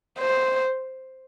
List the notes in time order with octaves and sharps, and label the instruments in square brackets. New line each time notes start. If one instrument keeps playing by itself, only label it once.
[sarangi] C5